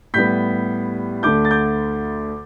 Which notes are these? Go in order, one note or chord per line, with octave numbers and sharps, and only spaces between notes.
A2 G3 B3 G6 B6
D2 D3 A3 D6 G6
A6
D6 G6